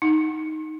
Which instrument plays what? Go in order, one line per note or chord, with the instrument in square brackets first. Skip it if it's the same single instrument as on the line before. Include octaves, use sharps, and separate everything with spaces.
[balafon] D#4